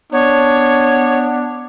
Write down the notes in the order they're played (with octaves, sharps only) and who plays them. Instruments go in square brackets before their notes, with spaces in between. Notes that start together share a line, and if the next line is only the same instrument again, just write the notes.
[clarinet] B3 [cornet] D4 [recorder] C#5